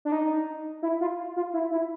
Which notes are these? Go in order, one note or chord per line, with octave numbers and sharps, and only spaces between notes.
D4
D#4
E4
F4
F4
E4
E4